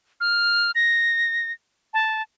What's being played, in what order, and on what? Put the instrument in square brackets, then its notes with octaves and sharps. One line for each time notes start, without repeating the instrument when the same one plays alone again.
[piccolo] F6
A#6
A5